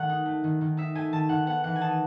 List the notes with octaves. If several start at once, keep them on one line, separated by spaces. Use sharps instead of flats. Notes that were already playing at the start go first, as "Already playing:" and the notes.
Already playing: D#3 A3 F#5
D#4
A3
D#3
D#3
D#4 E5
A3 G#5
D#3 A5
D#3 F#5
B3 F#5
E3 F#5
G#5
D#4 A5